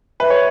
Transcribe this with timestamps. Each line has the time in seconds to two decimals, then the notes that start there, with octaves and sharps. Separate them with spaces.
0.20 B4 E5
0.30 C#5